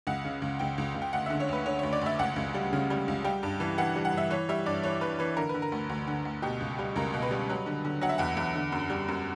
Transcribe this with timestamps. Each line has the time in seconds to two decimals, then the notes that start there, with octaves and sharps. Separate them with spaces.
0.07 C#2 F#5
0.25 C#3
0.42 C#2
0.59 C#2 G5
0.78 C#2
0.95 C#2
1.02 G5
1.13 D2 F#5
1.26 D3 E5
1.40 C#5
1.49 D2 B4
1.66 D3 C#5
1.79 D2 C#5
1.93 D5
2.01 D2 E5
2.19 C#2 F#5
2.36 C#2
2.54 G3
2.73 C#3
2.90 G3
3.08 C#2
3.24 G3 G5
3.43 G2
3.60 E3
3.78 E3 F#5
3.96 G3
4.05 F#5
4.13 G2 E5
4.30 E3 C#5
4.49 G3 E5
4.66 G2 D5
4.83 E3 C#5
5.01 E3 B4
5.19 E3 B4
5.37 D3 A#4
5.49 D3 B4
5.62 A#4
5.72 D2
5.89 D2
6.07 D3
6.25 D2
6.42 B2 G4
6.60 C#2
6.79 G3
6.96 C#2 A#4
7.14 B2
7.22 B4
7.31 G3
7.49 F#3
7.66 D3
7.85 D3
8.01 F#3 F#5
8.09 E5
8.18 E2 F#5
8.37 E2
8.56 D3
8.72 F#2
8.90 G3
9.08 F#2